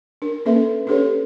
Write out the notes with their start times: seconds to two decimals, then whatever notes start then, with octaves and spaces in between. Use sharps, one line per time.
0.22 D4 A#4
0.46 A#3 C#4 A4 B4 E5
0.87 C#4 D4 G4 A4 B4 C#5